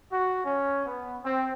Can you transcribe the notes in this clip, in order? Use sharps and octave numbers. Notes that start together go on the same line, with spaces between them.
F#4
C#4
B3
C4